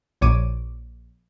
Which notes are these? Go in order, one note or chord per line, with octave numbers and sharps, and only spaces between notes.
A#1 C#5 D6 D#7